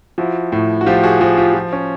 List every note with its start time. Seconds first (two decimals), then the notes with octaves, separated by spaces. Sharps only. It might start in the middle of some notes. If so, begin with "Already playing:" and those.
0.18 F3 E4 F#4
0.52 A2
0.81 F#4
0.86 F3 F4 G4
1.03 F#4 G#4
1.20 F3 F#4 G#4
1.37 F4 G4
1.54 F3
1.73 C#4